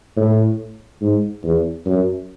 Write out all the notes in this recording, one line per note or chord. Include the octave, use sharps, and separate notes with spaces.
A2
G#2
E2
F#2